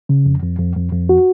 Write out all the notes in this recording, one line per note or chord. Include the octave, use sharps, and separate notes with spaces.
C#3
F2
F2
F2
F2
F2
F#4